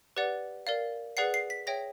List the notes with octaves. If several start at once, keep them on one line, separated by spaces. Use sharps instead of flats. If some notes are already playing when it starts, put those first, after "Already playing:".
G4 B4 D5 F#5
A#4 D5 F5
G#4 B4 D5 F#5 C7
C7
B6
G#4 C#5 E5 G5 A#6